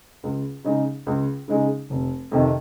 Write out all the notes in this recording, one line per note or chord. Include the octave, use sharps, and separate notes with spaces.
C#2
C#3 G#3 D#4 G#4
C#2
C#3 G#3 D#4 G#4
F1
F2 C3 D#3